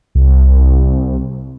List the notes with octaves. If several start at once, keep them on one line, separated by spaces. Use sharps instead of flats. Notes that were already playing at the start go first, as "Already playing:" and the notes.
C2